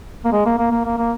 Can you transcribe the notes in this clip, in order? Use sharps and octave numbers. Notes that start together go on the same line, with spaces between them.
A#3
G#3
A#3
A#3
A#3
A#3
A#3